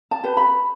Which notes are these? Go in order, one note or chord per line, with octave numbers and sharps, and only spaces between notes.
A5
G4 B4
B5